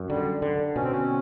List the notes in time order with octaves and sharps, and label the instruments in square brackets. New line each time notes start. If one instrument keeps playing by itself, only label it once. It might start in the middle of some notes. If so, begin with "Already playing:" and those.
Already playing: [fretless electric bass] F#2
[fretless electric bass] D3 [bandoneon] G3
[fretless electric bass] D3
[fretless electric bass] B2 [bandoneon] C#4
[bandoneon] C4
C#4